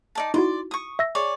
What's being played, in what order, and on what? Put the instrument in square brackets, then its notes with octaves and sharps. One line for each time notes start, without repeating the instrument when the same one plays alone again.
[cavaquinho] D#4 D5 A5
[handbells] D#4 E4 F#4 [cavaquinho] D5 C6
[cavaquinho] C#6 D#6
[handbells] E5 E6 A#6
[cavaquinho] G#4 C#5 D5